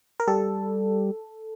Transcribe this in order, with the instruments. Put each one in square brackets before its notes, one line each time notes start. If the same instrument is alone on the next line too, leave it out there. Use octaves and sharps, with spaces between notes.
[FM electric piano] A#4
[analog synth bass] G3 [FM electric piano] A4